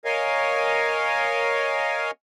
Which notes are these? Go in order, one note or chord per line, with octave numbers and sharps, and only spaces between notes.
A#4 C#5 D#5 F5 G#5